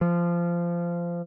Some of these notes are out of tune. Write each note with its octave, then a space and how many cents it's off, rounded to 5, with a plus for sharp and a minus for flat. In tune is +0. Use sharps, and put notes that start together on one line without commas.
F3 -20